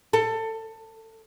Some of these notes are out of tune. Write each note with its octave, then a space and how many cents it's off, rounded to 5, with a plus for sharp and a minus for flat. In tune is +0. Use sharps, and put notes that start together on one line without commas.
A4 +20